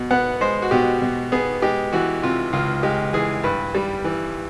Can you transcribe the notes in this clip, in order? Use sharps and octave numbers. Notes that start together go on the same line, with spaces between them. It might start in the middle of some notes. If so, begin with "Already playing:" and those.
Already playing: B2
B3 F#5
G#3 C5
F#4
B2 G4
B2
B3 G#4
G#3 G4
E3 F#4
C3 F4
C#2 F4
G#3 G4
E3 G#4
G2 B4
G3
E3